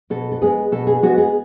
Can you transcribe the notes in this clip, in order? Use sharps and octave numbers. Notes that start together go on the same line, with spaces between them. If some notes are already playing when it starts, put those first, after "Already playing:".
B2 A4
A4
G#3 B3 G#4
B2 A4
G#4
G#3 B3 F#4
G#4